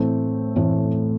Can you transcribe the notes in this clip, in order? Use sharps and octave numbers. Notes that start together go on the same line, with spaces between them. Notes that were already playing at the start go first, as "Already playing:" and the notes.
Already playing: A2 E3 A3 C4
A2 E3 A3 C4